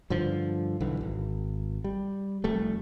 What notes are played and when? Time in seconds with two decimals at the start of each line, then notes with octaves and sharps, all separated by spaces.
0.10 G2 D3 F3
0.81 B1 D3 E3
1.01 G#1
1.84 G3
2.44 F1 G3 A3